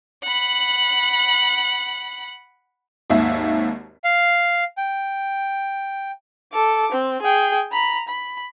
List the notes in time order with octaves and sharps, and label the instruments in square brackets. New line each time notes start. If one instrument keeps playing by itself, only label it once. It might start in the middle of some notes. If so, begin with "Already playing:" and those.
[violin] F#5 B5
[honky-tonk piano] G#1 D#2 E5
[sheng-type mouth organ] F5
G5
[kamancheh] A4 D6
C4
G#4 G5
A#5 B5
B5